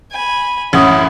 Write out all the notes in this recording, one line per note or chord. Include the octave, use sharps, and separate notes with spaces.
G#5 B5
A1 F#2 C#4 E4 C#5 F#5 D#6